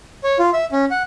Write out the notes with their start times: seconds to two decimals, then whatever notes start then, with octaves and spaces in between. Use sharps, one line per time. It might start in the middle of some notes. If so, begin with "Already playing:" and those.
0.24 C#5
0.39 F4
0.53 E5
0.72 C#4
0.91 F#5